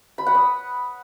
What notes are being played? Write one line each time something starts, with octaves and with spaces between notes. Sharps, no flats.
B5
F#5
D#6